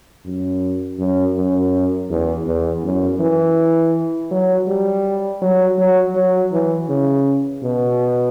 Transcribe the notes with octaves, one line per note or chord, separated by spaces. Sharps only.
F#2
F#2
F#2
E2
E2
F#2
E3
F#3
G3
F#3
F#3
F#3
E3
C#3
B2